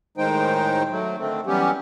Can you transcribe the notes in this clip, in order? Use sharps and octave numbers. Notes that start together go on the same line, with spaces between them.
A2 D#3 G#3 D#4 C5 G5
F#3 A3
D3 D#3 A3 C4
E3 F#3 G3 B3 C#4 G4